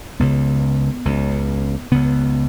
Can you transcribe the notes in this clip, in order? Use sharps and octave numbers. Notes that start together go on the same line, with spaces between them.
C#2 C#3 B3
C#2 C#3
C#2 C#3 B3